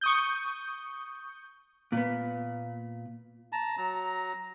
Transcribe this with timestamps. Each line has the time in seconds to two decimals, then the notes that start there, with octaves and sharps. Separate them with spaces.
0.01 C#6 D#6 G6
1.92 A#2 B3
3.52 A5 A#5
3.78 F#3 A#5